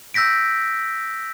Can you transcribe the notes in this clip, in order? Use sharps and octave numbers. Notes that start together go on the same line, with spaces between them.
E6 G6 A#6 B6 D7